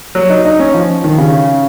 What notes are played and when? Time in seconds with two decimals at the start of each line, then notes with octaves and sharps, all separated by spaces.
0.15 F#3
0.30 D#4
0.45 D#4
0.59 C#4
0.74 F3
1.04 D#3
1.18 C#3